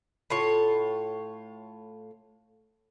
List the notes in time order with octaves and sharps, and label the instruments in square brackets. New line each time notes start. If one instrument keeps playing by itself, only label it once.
[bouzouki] A2 F4 C#5